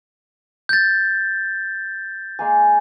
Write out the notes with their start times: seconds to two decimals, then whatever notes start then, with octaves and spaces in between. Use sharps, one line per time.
0.69 G6 A6
2.39 G#3 A#3 G#5